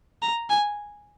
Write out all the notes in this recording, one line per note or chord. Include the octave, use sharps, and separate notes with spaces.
A#5
G#5